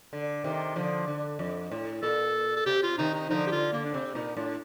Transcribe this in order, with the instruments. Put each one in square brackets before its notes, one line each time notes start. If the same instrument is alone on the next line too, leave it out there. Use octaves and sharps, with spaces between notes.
[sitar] D3
C3 D#3
D3 F3
D3
F2
A2
[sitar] A#2 [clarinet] A4
[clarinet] A4
[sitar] C3 [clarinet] G4
[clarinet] F4
[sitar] C3 D#3 [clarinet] D#4
[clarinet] D#4
[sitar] D3 F3 [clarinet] D#4
[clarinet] G4
[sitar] D3 [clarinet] F4
[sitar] D3 [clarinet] A#3
[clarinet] D4
[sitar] C3 [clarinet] C4
[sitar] A#2 [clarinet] D#4
[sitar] A2 [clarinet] D4